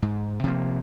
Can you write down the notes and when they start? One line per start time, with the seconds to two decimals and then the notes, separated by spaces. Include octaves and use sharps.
0.02 G#2
0.44 C3 F3 F#3 A#3